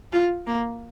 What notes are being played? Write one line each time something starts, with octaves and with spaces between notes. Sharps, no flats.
F4
A#3